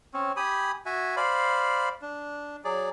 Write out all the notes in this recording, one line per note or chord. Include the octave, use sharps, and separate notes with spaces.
C4 C#4
G4 G#5 B5 D#6
F#4 E5 G#5
C5 D5 F5 B5
D4
F#3 G#4 D5